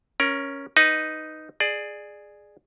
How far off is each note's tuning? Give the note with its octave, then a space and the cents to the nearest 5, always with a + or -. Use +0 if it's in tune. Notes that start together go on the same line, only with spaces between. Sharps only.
C#4 +0 A#4 +15
D#4 +0 B4 +5
G#4 +0 D5 +20